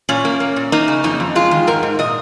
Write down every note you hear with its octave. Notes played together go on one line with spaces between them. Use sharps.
A#2 C#4
A#3
A#3
A#2
A#3 D#4
C#3
F2 D#4
F2
G#3 F4
D#3
G#2 A#4
G#2
A#2 D#5